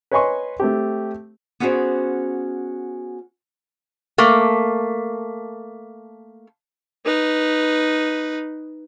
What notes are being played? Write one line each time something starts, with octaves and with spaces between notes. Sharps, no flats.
B4 C#5 D#5 G#5 C6 C#6
A3 C4 G4
B3 C#4 F#4 G#4 C5 D5
A3 A#3
D#4 B4